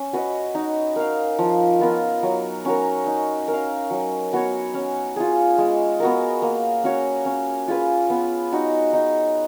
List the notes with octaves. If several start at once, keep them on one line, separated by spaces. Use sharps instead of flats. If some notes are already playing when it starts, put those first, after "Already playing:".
Already playing: C#4
F#4 B4 D#5
D#4
A#4 F5
F3
B3 F4 A#4
F#3
C#4 F#4 A#4
D#4
A#4
F5
F#3
B3 F#4 C#5
C#4
F4 G#4
G#3
B3 F#4 A#4
A#3
C#4 F#4 C#5
C#4
F4 G#4 B4
B3
D#4 F#4
D#4